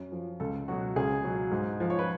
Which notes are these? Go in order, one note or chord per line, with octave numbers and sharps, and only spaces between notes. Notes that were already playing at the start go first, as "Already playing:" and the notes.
Already playing: F#2
F3
C#2 A4
B2 F#3 F#4
C#2 G#4
B2 F#3
G#2
F3
C#5
B4